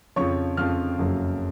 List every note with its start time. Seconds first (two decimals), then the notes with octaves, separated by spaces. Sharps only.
0.16 F2 C#3 F3 C#5 C#6
0.57 F2 C#3 F3 F5 F6
0.99 F#1 F2 C#3 F#3